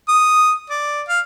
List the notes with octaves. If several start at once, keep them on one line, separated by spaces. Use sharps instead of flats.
D#6
D5
F5